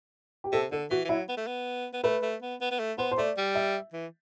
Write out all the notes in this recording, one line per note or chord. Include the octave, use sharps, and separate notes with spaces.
G4
C3 A4
D3 A4
E3 F#4
E3
F#3 E4
B3
A3
B3
B3
A3 B4
A3
B3
B3
B3
A3
B3 C5
C5
A3 D5
G3
E5
E3